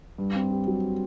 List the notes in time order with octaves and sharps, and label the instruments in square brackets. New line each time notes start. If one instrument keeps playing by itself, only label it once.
[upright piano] G2
C4
G4
F#3